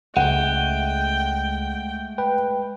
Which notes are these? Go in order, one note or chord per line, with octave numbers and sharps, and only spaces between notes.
C#2 G#3 A3 F#5 G5
B4 G5